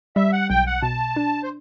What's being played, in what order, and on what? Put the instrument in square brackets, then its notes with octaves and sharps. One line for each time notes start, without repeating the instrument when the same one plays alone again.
[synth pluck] G3 [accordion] E5
[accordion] F#5
[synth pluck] B1 [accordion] G5
[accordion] F#5
[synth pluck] B2 [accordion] A5
[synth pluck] D4
[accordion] C5